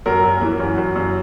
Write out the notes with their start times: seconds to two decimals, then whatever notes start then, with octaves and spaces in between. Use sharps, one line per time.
0.06 F#2 A#4
0.24 F#2
0.41 E3
0.60 F#2
0.78 F#2
0.96 F#2